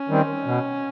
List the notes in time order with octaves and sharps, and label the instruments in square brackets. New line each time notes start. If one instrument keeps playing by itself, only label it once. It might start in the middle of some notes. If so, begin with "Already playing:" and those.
Already playing: [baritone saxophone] C#4
[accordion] D#3 G3 C4
B2